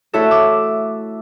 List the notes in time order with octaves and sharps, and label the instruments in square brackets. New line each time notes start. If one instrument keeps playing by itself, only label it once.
[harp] A3 E4 F#4 A4 C#5 E5
D6 E6